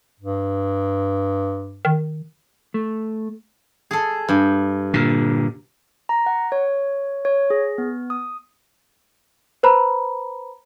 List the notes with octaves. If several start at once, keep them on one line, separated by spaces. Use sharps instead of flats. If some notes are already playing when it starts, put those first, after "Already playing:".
G2
D#3
A3
G#4 A4
G2
A#2 D3
A#5
F#5
C#5
C#5
G#4
B3
D#6
B4 C5 A#5 B5